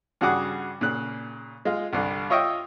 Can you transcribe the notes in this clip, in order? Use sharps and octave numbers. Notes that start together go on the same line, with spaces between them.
G2 C#3 F#4 G#4 F#5 D6
A#2 C#3 F#6
G#3 F4
C2 G2 D3
F4 C#5 D#5 E5 G5